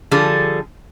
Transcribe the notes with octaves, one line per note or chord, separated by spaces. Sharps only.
D3 F3 G3 G#4 A4